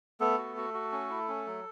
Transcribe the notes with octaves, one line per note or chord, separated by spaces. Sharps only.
A3 B3 A4
F#4
F#4
F#4
C#4
E4
C#4
F#3